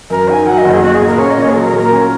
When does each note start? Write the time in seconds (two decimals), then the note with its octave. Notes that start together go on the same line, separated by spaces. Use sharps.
0.10 F#2 A#4
0.29 D#4 G#5
0.46 F#3 F#5
0.58 D#5
0.65 F#1
0.71 G#4
0.82 A#3 F#4
0.94 G#4
1.01 A#2
1.07 A#4
1.19 C#4 C#5
1.30 D#5
1.38 A#2 C#5
1.50 G#4
1.55 F#3 A#4
1.67 A#4
1.73 A#2
1.79 A#4
1.92 C#4